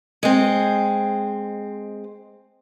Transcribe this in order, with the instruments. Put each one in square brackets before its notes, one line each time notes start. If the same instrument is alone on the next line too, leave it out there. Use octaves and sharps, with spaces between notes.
[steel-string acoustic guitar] G#3 C4